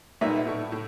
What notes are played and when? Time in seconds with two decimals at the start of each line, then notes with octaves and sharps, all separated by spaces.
0.21 B1 A#2 G3 D#4 B4 E5
0.47 A2 C#6
0.72 A2